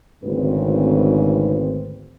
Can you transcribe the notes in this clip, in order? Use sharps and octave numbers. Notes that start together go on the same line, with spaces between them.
G#1 D2 G#2 C#3 C4 B4